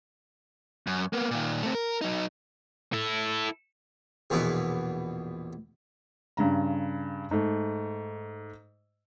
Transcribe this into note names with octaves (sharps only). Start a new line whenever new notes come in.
F#2
A#3 B3
A#2 D#3
A3 C4
A#4
F#3 D#4
E4 A4
A#1 E2 B2 E4 B4
G2 C#3 A#5
G#2 A3